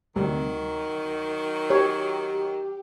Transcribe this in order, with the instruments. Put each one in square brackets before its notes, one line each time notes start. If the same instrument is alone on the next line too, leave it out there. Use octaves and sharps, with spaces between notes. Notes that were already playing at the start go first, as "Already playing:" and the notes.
[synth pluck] D2 C3 G3 [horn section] D#3 F#3
[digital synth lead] G4 [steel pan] C#5